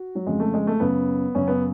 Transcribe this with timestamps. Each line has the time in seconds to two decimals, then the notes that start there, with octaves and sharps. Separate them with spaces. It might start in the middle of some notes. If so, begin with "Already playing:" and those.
Already playing: F#4
0.15 F#3
0.26 F2 C#3 G#3
0.40 A3
0.54 G#3
0.67 A3
0.80 F#2 C#3 B3
1.35 F#2 C#3 C#4
1.48 B3